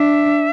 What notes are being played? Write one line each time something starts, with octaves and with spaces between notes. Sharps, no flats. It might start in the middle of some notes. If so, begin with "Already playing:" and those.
Already playing: D4 E5